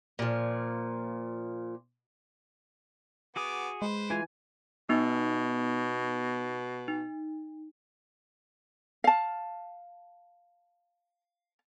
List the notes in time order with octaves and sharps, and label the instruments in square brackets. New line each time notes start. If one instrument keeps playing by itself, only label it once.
[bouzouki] A#2 F3
[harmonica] B3 D6 [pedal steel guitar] F#4 G#4 D#6
[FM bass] G#3 [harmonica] B4 C5
[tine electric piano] E3 G#5 [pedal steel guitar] E4 F4
[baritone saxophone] B2 [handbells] B3 D#4
[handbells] D#4
[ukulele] F5 A5